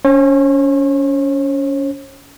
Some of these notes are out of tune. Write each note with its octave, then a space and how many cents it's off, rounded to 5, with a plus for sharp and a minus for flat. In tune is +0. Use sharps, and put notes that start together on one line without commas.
C#4 +25 C#5 -45